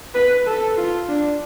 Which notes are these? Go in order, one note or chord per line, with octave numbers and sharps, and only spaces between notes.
B4
A4
F4
D4